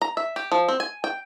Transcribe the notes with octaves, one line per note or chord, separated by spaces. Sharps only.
A#5
E5
G4
F3
C4
G#5
G5